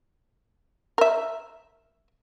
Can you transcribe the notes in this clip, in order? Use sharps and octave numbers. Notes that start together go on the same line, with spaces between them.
A#4 E5